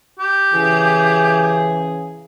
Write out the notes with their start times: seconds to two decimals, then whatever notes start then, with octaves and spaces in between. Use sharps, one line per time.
0.19 G4
0.53 C#3 E3 G#4